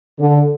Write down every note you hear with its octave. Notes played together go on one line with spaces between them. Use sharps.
D3